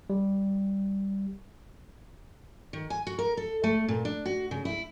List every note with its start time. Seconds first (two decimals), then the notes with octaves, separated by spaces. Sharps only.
0.10 G3
2.73 D#3
2.90 G#5
3.07 F#4
3.19 A#4
3.37 A4
3.64 A3
3.89 A#2
4.05 D4
4.26 F#4
4.51 C#3
4.65 E4